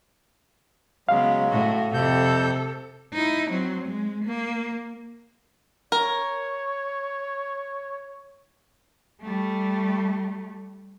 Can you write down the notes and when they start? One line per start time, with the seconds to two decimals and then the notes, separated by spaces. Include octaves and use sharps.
1.09 C#3 F#3 G#3 B3 F5
1.50 A2 F#4
1.94 F2 C3 A4 G6
3.14 D#4 E4
3.51 F#3 C4
3.88 G#3
4.24 A#3
5.92 A#4 C#5
9.22 G3 A3